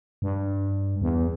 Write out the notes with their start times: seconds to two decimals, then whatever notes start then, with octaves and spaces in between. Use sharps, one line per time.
0.22 G2
1.02 E2